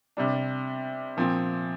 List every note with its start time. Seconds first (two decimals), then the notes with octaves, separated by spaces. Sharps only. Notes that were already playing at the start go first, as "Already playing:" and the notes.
0.17 C3 G3 D4
1.17 A#2 F3 C4